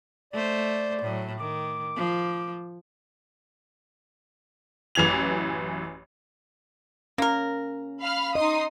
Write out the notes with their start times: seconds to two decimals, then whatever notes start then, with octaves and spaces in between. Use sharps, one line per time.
0.33 A3 C5 D5
1.02 A2 F#3
1.39 D#3 D6
1.97 F3
4.95 A1 F#2 E3 G#6 F7
7.18 A#3 C#4 A#4
8.01 F5 B5 F6
8.35 D#4 D#5 C6 D#6